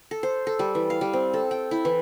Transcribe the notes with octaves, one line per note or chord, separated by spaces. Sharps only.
A4
C5
A4
G3
E3
F5
G3
C4
A4
G5
E4
E3